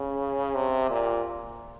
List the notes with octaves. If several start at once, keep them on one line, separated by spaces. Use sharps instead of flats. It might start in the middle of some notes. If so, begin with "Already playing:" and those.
Already playing: C#3
C3
A#2